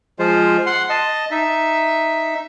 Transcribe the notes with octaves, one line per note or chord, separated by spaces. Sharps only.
F3 G#3 F4 C5
F#5 C6
D#5 A5
D#4 E5